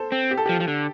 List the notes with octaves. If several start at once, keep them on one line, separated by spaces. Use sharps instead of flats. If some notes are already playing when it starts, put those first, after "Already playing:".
Already playing: A4 C5
C4
G4
A4
F3 G4
F3
D3